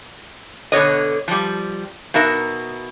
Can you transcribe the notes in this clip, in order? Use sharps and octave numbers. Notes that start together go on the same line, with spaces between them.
B2 D3 C#5 D#5
F3 G3
B2 D#4 A#4 E5